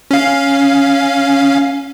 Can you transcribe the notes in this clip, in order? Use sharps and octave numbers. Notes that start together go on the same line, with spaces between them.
C#4 F5